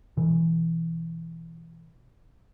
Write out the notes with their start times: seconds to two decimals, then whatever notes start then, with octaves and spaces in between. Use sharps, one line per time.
0.17 B2 E3